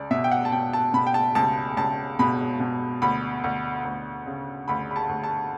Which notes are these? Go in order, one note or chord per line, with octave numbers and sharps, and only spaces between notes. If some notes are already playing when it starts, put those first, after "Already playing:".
Already playing: C#2 D5
B2 E5
G5
F#5
A5
B2 G5
A5
B2 B5
G5
A5
C#2 A5
C#2 A5
B2 B5
B2
D2 B5
D2
D2
C#3
D2 B5
B5
A5
D2
A5